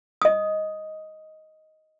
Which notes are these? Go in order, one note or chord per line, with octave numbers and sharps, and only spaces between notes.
D#5 D#6